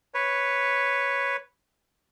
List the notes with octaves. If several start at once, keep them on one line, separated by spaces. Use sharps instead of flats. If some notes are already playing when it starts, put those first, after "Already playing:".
B4 C#5